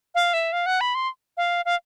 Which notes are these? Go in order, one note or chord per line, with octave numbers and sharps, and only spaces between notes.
F5
E5
F5
F#5
B5
C6
F5
F5